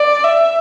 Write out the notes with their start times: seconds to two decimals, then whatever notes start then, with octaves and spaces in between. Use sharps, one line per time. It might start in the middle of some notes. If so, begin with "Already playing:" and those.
Already playing: D5
0.24 E5